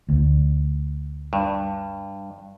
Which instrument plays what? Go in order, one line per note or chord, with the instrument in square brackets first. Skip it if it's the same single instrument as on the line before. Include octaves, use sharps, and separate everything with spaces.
[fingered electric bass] D2
[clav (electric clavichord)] G2